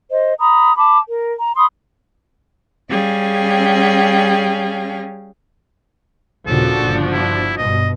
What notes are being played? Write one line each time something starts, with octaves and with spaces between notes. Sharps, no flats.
C5 D#5
A#5 B5 D#6
A5 B5 D6
A#4
A#5
B5 C6 D#6
G3 C#4 G#4 F5 G5
D#2 A#2 C#3 F3 D4 F#4 A4
G1
E4
G2 B2 D#5